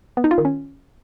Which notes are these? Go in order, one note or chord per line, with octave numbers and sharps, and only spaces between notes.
B3
D#4
F4
D#3
C#4